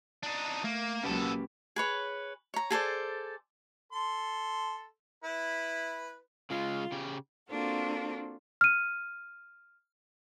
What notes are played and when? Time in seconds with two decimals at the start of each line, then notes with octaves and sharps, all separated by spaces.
0.23 D4 D#4
0.64 A3 A#3
1.03 C#2 B2 F#3 A#3 C#4 G4 A4 B4
1.76 G#4 B4 C#5
2.54 C#5 A#5
2.70 G#4 A4 C5 D5
3.92 A4 C6
5.24 E4 B4
6.50 C#3 G#3 F4
6.92 C#3 G4
7.49 A#3 C4 D4 F4 F#4 A4
8.61 F6 D#7